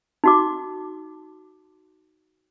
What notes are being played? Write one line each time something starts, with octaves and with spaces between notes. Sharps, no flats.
D#4 F#4 D6